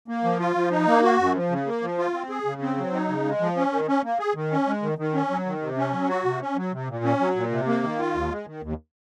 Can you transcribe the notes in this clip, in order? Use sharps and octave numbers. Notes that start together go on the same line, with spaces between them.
A#3
F3
F4
F3
D#4
A#3
F#4
F#2
F3
C#3
A#3
F3
F4
C4
G#4
C#3
C4
F#3
D#4
C#3
G#3
F3
C#4
D#3
C#4
A#3
G#4
D#3
C#4
G#3
D#3
D#3
C#4
F#3
D#3
C3
C#4
F#3
F#4
C3
C#4
F#3
C3
A#2
C#4
F#3
A#2
C3
A#3
D#3
F4
D#2
G#3
D#3
D#2